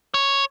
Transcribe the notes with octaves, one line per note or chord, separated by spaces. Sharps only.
C#5